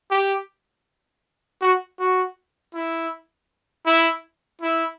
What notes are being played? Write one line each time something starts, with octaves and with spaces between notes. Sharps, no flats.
G4
F#4
F#4
E4
E4
E4